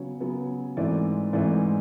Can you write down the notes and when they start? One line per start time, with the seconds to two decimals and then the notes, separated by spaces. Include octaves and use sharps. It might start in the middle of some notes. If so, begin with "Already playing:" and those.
Already playing: C#3 F#3 B3 C#5
0.20 C#3 F#3 B3
0.77 G#2 E3 A3 C4 D5
1.33 G#2 E3 A3 C4 D5